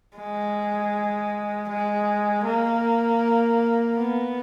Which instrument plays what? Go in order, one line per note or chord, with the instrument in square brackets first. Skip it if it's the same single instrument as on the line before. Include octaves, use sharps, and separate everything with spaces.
[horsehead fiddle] G#3
G#3
A#3
B3